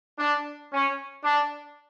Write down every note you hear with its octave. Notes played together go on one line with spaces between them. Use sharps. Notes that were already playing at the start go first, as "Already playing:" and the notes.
D4
C#4
D4